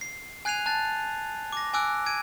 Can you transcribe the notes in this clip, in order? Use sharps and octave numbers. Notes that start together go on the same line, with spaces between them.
C7
G#5 F#6 G#6 C7 D#7 F7
A5 F#6 A6
D6 A#6
G#5 D6 E6 F#6 D7
G#6 D7 D#7